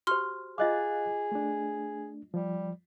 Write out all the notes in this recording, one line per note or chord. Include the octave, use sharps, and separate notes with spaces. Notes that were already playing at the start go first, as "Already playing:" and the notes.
F#4 G4 C5 C6 F6
F4 G#4 D#5 F5 D6 F#6 A6
A3 D4
F3 G3